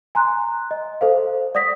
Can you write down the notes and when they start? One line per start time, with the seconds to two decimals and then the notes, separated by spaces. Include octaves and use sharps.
0.15 G#5 A#5 C6 F#6
0.71 D#5
1.01 A4 C5 F5
1.55 D5 F#5 D#6 A#6 B6